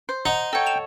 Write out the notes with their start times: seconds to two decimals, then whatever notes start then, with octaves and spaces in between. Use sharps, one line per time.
0.09 C5
0.26 D#4 F#5 F7
0.53 A4 C#5 D#5 F#5 G5
0.66 E7 F7